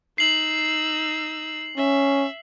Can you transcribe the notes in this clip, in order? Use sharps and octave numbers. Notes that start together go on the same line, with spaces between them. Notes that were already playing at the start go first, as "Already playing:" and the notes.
D#4 E6 C7 F#7
C#4 E5